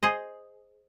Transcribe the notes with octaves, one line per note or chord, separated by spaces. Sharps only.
G#4 C5 D#5